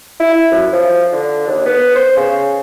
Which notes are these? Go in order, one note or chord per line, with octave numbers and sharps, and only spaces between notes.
E4
F#2
F3
D3
D#2
B3
C5
C#3